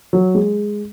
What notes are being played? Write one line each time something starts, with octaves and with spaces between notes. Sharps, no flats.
F#3
G#3